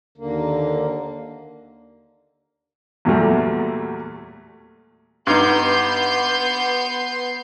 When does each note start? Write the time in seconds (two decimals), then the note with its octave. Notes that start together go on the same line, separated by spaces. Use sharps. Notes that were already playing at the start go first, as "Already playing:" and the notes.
0.18 D#2 D3 A#3
3.05 E2 A#2 F#3 G3 A3
5.27 G2 B3 D#4 C6 G6